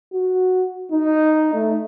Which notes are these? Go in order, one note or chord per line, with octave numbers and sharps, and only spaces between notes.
F#4
D#4
A3